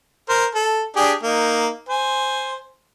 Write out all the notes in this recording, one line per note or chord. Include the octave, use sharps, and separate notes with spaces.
A#4 C5
A4
D4 G4 G#4
A#3 D#4
C5 G#5